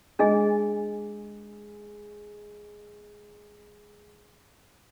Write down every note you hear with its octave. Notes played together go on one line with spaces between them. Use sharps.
G#3 D4 G#4 D#5 G#5